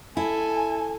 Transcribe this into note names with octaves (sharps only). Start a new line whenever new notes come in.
E4 A4 G#5